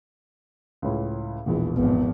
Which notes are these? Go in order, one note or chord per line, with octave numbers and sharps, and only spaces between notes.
C#2 A2
E1 A#1 E2 E3
G#1 F3 B3